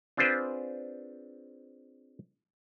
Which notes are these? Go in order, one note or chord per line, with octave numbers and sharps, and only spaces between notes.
C4 D4 F4 G#4 B4 C5